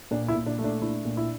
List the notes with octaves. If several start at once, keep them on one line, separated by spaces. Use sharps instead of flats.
A#2 D4
E4
A#2
D4
A3
D4
D4 E4
A#2
E4